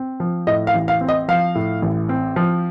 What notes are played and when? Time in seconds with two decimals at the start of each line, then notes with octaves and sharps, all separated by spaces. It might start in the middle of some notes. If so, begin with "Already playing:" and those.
Already playing: C4
0.20 F3
0.47 A2 D#5
0.67 F5
0.74 A1
0.88 F5
1.01 C4
1.09 D#5
1.28 F3 F5
1.55 A2
1.82 A1
2.09 C4
2.36 F3